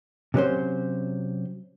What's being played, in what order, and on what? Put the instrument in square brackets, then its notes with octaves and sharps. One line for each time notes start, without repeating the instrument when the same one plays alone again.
[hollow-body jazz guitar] C3 F#3 C#4 C5